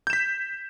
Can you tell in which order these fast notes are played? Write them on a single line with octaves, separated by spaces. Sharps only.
G6 E7 B6